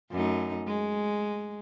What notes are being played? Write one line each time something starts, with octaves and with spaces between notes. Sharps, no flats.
F#2 A3 D#4
G#3